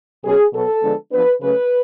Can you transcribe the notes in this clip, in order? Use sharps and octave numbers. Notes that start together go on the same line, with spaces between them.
B2 F#3 C#4 G#4
B2 F#3 B3 A4
D3 F3 G#3 B3 D4
F3 B3 D4 B4
C#3 F#3 A3 C#4 B4